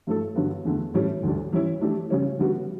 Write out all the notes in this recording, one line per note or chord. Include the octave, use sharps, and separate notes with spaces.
G2 F#3 A3 E4 A4
G2 D3 F#3 B3 F#4
E2 D3 A3
A2 E3 G3 C#4
D2 D3 G3 D4
E3 G3 C#4 E4
E3 A3 D4 G4
C#3 G3 C#4
D3 G3 B3 F#4